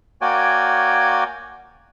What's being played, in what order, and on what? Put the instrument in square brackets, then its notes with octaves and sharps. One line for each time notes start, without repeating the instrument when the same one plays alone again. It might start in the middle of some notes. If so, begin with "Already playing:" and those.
[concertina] A#3 F#4 C#5 D5 G5 G#5